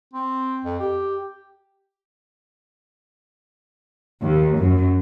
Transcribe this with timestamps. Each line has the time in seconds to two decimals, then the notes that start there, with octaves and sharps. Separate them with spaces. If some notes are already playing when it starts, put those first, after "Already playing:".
0.14 C4
0.65 F2
0.80 G4
4.23 D#2
4.58 F#2